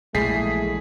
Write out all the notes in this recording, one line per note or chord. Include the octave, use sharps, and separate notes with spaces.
A#1 E3 G#3 A3 G#4 B6 C7